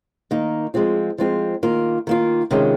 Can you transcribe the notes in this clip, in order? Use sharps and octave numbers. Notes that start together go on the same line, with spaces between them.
D#3 A#3 D#4
F3 G#3 C4 F4
F3 G#3 C4 F4
D#3 A#3 F4
D#3 A#3 F4
C3 D#3 G#3 C#4 F4